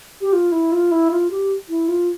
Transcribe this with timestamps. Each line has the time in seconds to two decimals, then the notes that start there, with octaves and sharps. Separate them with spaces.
0.21 G4
0.33 F4
0.52 E4
0.72 F4
0.92 E4
1.11 F4
1.31 G4
1.69 E4
1.88 F4